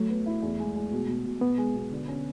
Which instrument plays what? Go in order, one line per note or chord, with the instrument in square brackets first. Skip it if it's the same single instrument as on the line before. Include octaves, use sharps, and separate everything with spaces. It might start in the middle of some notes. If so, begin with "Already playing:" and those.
Already playing: [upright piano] F#3 [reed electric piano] A3
[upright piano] B3
E4
E2
G#3
G#3
B2
B2
B2
[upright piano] B2 [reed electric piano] B3
[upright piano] G#3
B2
D3
C#4